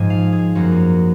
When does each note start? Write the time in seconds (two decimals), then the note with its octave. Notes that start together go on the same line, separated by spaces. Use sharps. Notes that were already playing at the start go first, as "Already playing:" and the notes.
Already playing: G#2 F3 G#3 G#5
0.10 F5
0.32 G#4
0.55 F#2 F3 A#3 F#4